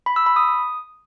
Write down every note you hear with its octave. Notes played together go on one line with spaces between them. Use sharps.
B5
E6
B5
D#6